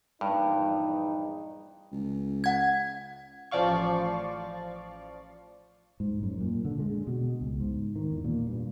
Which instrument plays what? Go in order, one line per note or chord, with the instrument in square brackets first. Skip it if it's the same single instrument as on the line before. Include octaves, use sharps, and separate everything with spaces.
[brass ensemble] A#1 E2 D#4 [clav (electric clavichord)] G2
[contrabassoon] C#2
[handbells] F#5 G#6
[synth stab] A1 F3 D5 F5 C#6
[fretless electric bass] G#2
F#2
A#2
D3
G#3
B2
C#2
G#2
D#3
E2
A#2
G2